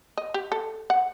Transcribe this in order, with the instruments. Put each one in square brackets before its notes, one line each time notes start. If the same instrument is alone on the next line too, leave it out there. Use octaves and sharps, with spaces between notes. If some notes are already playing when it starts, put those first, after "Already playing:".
[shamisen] D#5
G4
A4
F#5